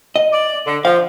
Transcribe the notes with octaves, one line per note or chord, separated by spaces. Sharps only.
D#5
D5
D3
F3 F5